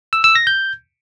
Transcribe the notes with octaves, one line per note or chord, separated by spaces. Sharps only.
E6
E6
A#6
G6